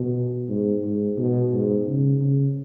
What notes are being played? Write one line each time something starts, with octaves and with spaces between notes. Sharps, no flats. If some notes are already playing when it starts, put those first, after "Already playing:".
Already playing: B2
G#2
G#2
B2
G#2
C#3
C#3